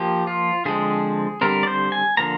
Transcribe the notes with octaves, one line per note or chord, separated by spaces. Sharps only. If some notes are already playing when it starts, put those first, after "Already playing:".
Already playing: F3 A#3 G4
F4
D3 F3 G#3 C4 G#4
D3 G3 C4 A#4
D5
C5
G#5
D3 F3 A#3 A#5